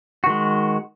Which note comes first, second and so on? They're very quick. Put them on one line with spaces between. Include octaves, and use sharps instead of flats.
F#4 D#3 G#3